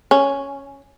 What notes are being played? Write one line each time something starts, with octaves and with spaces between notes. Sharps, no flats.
C#4